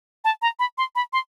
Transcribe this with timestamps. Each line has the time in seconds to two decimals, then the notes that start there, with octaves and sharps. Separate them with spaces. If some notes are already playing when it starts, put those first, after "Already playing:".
0.24 A5
0.42 A#5
0.59 B5
0.78 C6
0.95 B5
1.13 C6